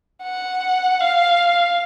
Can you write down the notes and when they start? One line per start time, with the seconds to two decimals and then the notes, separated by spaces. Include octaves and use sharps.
0.22 F#5
1.00 F5